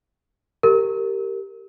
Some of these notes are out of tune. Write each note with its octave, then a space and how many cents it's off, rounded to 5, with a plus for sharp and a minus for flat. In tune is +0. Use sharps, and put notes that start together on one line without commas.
G4 +0 A#4 -20